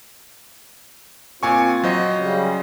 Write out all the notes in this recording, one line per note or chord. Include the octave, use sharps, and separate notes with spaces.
A#2 C4 F4 G#5 C#6
F#3 C5 D#5
C#3 G3